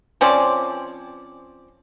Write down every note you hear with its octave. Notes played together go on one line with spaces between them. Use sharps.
F3 C4 C#4 D5